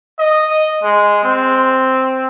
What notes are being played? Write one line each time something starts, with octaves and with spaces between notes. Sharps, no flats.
D#5
G#3
C4